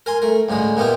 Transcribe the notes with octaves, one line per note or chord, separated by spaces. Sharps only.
A#4 G#5 C6
A3 A#4
C#2 A2 D3 G#3
A#2 B3 E4 F4 G4